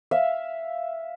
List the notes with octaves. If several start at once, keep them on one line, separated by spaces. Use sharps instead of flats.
E5 F5